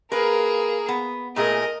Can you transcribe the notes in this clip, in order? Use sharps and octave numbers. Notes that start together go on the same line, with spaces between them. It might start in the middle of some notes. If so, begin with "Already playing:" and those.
A#3 G#4 A#4 B4
B3
A#2 A3 G#4 A#4 D#5